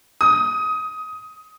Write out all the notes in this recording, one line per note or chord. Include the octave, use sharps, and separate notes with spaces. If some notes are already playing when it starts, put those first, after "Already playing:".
D#6